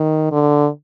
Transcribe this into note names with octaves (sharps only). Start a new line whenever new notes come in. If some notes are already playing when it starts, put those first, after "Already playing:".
Already playing: D#3
D3